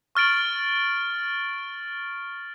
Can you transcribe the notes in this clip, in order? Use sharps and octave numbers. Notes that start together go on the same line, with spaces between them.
C#6 F6 A6 D7 F#7